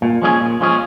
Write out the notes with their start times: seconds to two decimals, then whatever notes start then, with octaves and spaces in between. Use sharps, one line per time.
0.02 A#2
0.22 F3 G#3 C#4 G#4
0.41 A#2
0.60 F3 G#3 C#4 G#4